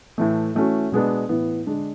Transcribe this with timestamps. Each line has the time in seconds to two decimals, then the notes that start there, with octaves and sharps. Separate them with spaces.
0.18 A2 E3 A3
0.55 E3 A3 C#4 F#4
0.92 B2 G#3 B3 D4
1.29 A2 E3 B3
1.67 D3 G#3 D4